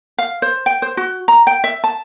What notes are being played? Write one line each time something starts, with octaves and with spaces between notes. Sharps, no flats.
F5
C5
G5
C5
F#4
A#5
G5
E5
A5